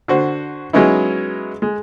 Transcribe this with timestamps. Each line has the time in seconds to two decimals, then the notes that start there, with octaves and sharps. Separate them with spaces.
0.08 D3 F#4 C5
0.73 F#3 G#3 B3 C#4 D#4 E4
1.62 G#3